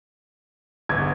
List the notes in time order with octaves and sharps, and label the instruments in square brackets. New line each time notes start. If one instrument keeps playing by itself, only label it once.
[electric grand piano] G1 [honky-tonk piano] G#6